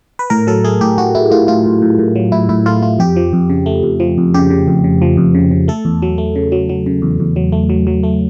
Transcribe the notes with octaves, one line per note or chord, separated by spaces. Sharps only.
B4
A2 A#4
F#3 A4
A3 G#4
A2 G4
A2 F#4
A2 E4
A2 F4
A2 F4
A2
A2
A2
F#3
A2 E4
A2 E4
A3 F4
A3 F4
F2 G4
F3
F2
C#3
A3
F2
F3
F2
C#3 G4
C#3
F2
C#3
F3
F2
C#3
C#3
A3 A4
E2
F#3
A3
C#3
F#3
F#3
C#3
E2
E2
F#3
A3
F#3
F#3
A3